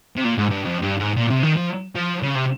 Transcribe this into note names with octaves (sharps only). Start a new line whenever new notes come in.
C3
A#2
G#2
G2
F2
G2
G#2
A#2
C3
D#3
F3
F3
C#3
C3